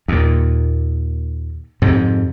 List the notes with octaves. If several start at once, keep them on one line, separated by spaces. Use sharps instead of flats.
D#2 A#2
F2 G#2 C3